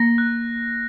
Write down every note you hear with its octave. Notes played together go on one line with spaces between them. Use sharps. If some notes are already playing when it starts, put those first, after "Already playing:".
Already playing: A#3 A#6
F#6